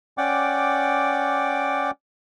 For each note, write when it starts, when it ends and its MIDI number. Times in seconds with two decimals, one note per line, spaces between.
0.18 1.91 61
0.18 1.91 74
0.18 1.91 78
0.18 1.91 79
0.18 1.91 86